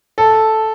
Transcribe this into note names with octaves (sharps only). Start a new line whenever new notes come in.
A4